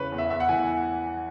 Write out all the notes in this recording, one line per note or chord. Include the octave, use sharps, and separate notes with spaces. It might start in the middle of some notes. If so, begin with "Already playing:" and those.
Already playing: E2 C#3 E3 B4 C#5
E2
E5
E2 E5
F#5
E3 G#5